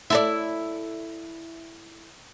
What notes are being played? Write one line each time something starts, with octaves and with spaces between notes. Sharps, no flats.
E4 A4 D5